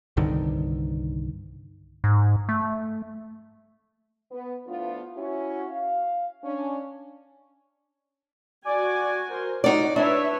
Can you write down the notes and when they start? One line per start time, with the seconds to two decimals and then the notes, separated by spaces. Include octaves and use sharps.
0.17 C2 G2 D3 D#3
2.04 G#2
2.49 A3
4.31 B3
4.67 F3 A3 B3 D4 E4 F4
5.17 C#4 E4 F#4
5.70 F5
6.44 C#4 D4
8.66 F#4 D5 G#5
9.30 A#4 C5
9.64 B2 D#4 F4 F#4 D5
9.96 D4 B4 C#5 E5